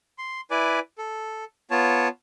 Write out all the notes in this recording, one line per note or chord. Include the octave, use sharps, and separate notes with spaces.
C6
E4 B4 D5 G#5 D6
A4
B3 F4 C#5 A5